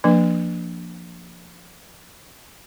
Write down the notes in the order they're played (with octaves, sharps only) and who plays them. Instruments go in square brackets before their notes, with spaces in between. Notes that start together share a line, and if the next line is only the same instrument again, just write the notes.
[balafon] F3 A#3 D4 B4